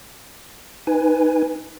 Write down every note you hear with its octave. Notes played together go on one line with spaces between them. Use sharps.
D#4 B4 G#5